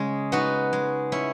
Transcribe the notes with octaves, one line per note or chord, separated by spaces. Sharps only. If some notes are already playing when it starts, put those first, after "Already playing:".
Already playing: C#3 G#3
B3 D#4 F#4
G#3
C#4 E4